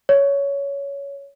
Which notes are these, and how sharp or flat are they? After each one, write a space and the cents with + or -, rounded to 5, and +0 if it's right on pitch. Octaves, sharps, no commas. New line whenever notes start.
C#5 +15